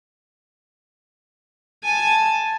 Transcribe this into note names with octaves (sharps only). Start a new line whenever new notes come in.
G#5 A5